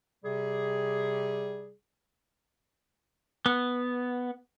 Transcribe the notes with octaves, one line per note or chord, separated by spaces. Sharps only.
C3 G3 G#4
B3